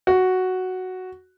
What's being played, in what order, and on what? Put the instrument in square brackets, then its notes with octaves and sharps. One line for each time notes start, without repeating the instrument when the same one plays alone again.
[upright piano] F#4